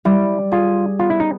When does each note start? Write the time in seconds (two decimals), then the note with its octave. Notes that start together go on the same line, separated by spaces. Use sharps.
0.05 G3 E4
0.52 F4 G#4
0.99 B3 F4
1.10 E4
1.20 D#4